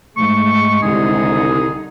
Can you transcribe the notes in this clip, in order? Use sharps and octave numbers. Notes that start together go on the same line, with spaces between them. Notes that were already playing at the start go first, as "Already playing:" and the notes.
G#2 G#3 A3 C#6
C2 D3 D#3 D#4 G#4